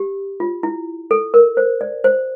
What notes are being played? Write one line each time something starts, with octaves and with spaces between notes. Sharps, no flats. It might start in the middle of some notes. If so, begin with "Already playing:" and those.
Already playing: G4
F4
E4
A4
A#4
C5
D5
C5